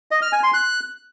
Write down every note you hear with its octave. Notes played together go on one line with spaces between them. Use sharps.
D#5
F6
G#5
C6
F#6